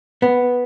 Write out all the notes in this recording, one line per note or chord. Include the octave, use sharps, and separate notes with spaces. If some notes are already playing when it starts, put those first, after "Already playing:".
B3